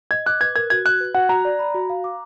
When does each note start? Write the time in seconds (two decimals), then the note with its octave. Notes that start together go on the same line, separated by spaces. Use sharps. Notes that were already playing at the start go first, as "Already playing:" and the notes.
0.11 D#5 G#6
0.26 D6 F#6
0.41 B4 G#6
0.55 A#4 G#6
0.70 F#4 G#6
0.85 F#4 F#6
1.00 B4
1.14 F#4 F#5
1.29 F#4 A#5
1.45 D5
1.59 B5
1.74 F#4
1.90 F5
2.04 D6